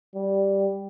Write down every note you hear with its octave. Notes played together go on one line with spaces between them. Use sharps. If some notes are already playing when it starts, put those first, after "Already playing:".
G3